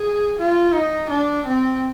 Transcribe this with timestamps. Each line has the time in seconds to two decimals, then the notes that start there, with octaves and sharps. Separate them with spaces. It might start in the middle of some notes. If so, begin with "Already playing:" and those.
Already playing: G#4
0.38 F4
0.74 D#4
1.10 D4
1.46 C4